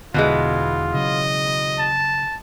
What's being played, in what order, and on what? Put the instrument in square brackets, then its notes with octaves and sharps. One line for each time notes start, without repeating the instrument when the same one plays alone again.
[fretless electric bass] E1 D3 [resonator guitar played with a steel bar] B2 E3 G#3 [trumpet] F4
[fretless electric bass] C#3 F#3 [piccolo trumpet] D#5
[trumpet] A5